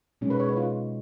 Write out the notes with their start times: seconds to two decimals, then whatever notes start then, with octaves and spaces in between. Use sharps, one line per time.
0.21 B2 G#3 C#4 D#4
0.30 B4
0.40 C#5
0.49 B4
0.57 F4